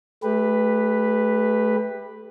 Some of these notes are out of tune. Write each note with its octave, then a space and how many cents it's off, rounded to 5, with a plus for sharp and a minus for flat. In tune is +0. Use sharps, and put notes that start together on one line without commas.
A3 -25 G4 +20 B4 +0